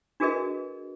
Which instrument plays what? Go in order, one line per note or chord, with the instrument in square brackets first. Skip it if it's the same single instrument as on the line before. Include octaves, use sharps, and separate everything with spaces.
[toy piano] D4 F#4 G#4 A#4 B4 D#5